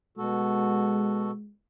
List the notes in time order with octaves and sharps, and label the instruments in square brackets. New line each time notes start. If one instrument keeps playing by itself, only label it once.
[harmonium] B2 F#4 A4 [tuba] G#3